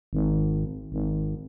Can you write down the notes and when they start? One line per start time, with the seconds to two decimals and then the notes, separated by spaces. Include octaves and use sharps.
0.13 G#1
0.92 G#1